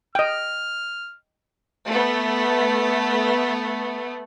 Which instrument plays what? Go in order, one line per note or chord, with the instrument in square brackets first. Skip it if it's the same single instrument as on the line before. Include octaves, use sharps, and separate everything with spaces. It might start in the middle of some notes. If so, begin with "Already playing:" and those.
[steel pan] D#5 G5 [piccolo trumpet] F6
[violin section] A3 B3